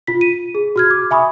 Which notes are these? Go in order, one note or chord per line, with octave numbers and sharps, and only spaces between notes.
F4 B6
D#7
G#4
F#4 F6 G#6
D6
E5 G#5 B5 C#6 D#6